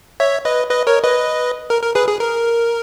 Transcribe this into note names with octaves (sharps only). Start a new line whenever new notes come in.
C#5 E5
B4 D#5
B4 D#5
A#4 C#5
B4 D#5
A#4
A#4
G#4 B4
G#4
A#4